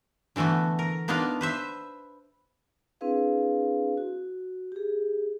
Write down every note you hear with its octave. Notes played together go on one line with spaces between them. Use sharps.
D3 E3 A3 B3 F#4
A#4
A#3 B3 D4 D#4 F4 F5
B4 C5 E5
C4 D4 E4 G#4 B4 F5
F#4
G4 G#4